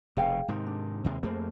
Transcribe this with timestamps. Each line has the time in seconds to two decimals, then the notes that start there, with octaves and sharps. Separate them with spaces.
0.17 F1 B2 G#4 F5 G5
0.48 G#2 C3 D#3
0.66 D4
1.04 D#2 C3 G#3
1.23 F2 A3 A#3 G#4 C5